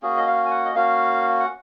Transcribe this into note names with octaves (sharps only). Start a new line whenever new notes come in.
A#3 C#4 F#4 G#4
D#5
F5
G#5
F#5
D#5
A#3 C#4 F#4 F5
F#5